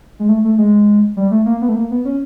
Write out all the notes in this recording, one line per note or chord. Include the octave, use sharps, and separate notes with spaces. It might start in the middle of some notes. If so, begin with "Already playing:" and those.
G#3
A3
A3
G#3
G3
A3
A#3
B3
A3
A#3
B3
C#4